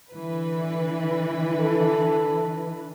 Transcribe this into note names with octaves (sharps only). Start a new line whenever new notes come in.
D3 E3 B4
A4